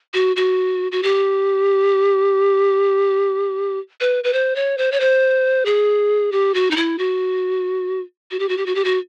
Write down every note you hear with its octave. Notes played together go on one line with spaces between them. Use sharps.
F#4
F#4
F#4
G4
B4
B4
C5
C#5
C5
C#5
C5
G#4
G4
F#4
D#4
E4
F#4
F#4
G4
F#4
G4
F#4
G4
F#4